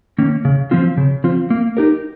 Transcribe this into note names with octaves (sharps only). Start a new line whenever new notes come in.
D#3 A#3 C#4
C#3
F3 C4 F4
C#3
F3 C4 F4
A#3
D#4 G4 A#4